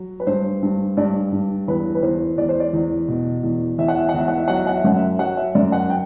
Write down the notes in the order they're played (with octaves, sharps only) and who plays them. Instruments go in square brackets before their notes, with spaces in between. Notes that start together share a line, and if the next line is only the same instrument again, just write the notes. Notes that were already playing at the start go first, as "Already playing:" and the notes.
Already playing: [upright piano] F#3
B4
G2 C5
G2
G2 D5
G2
E2 B4
B4
E2 C5
E2 D5
C5
D5
E2
B2
E2
E2 E5
F#5
E5
F#5
E2 E5
F#5
E5
F#3 F#5
E5
F#5
E5
F#2 F#5
E5
F#3 F#5
E5
F#2 D5
F#5
G5